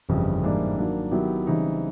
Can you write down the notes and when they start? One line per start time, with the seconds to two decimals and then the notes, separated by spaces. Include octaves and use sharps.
0.09 G1 F2 C#3 E3 G3
0.43 G#2 E3 G3 A#3 D4
0.77 D#3 F#3 A#3 D4
1.11 D#3 F#3 B3 E4 G4
1.47 C#3 E3 G3 C4 D#4